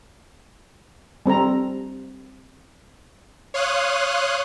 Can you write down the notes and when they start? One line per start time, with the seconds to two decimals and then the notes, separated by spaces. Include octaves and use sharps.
1.26 G3 C4 A4 A#5
3.54 C#5 F5 C6 D#6 F#6